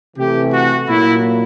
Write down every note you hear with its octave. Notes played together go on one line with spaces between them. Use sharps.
C3 E3 A3 G4
F#4
A#2 F#3 A#3 E4